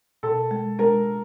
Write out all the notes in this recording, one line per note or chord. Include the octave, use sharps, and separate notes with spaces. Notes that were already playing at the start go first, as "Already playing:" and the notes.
B2 A4
G#3
G#3 A#4